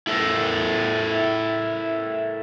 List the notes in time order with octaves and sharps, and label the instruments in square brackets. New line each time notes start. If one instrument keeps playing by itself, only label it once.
[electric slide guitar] E4 A4 A#4